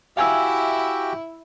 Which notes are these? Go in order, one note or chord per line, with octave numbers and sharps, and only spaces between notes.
E4 F#4 G4 E5 F5 G5 G#5 E6